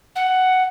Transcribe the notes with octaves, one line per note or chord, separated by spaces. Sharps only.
F#5